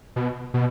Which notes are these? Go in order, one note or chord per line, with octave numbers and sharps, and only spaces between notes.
B2
B2